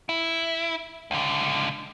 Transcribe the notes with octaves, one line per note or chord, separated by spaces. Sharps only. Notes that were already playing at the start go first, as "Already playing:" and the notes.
E4
C#2 D3